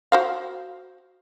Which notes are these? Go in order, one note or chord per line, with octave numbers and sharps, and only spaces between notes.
F#4 C5 F5